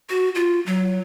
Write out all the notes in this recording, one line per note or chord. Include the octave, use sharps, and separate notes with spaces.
F#4
F4
F#3